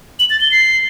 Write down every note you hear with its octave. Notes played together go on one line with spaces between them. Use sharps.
F#7
A6
G7
C7